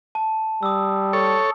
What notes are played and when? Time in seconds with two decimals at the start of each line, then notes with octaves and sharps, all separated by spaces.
0.15 A5
0.63 G3 D#6 E6
1.13 A4 C#5